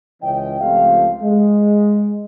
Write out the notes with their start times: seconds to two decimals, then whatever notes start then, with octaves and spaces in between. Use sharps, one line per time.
0.23 C#2 E3 C#4 D#5 G5
0.61 C#2 F3 A3 C4 G4 F5
1.21 G#3